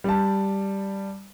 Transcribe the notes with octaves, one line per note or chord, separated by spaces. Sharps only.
G3 A5